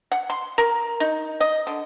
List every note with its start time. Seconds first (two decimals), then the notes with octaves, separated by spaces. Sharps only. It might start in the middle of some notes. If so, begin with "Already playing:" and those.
0.12 F#5
0.30 C6
0.58 A#4
1.00 D#4
1.40 D#5
1.67 D3